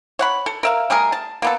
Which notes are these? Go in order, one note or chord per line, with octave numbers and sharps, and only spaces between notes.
C#5 F#5 B5
A4
A#4 E5 F5
G3 A3 G#4 A#4
A5
A#3 B3 A4